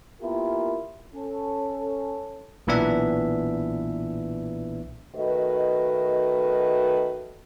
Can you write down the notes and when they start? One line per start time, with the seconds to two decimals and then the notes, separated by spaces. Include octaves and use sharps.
0.22 A#3 B3 E4 F4 G4 A#4
1.15 C#4 A4
2.67 B1 A#2 E3 B3 D4 E5
5.15 D#3 A3 F#4 B4 D#5